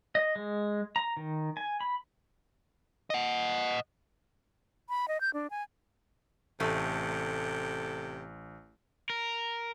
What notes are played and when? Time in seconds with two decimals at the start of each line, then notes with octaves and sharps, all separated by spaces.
0.15 D#5
0.36 G#3
0.96 A#5
1.17 D#3
1.57 G#5
1.81 B5
3.10 D#5 F#5
4.89 B5
5.08 D#5
5.21 G6
5.34 D4
5.51 G#5
6.60 A1 C3 A3 A4
9.10 A#4